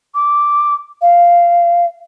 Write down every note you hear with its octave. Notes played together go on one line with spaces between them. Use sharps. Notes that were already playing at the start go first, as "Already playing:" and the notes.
D6
F5